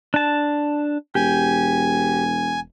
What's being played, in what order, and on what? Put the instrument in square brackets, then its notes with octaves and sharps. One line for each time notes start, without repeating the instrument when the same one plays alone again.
[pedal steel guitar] D4 A5
[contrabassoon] E1 [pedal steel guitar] G4 [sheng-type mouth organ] G#5